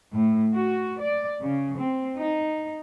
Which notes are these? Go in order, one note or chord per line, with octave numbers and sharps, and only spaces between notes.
A2
F#4
D5
C#3
C4
D#4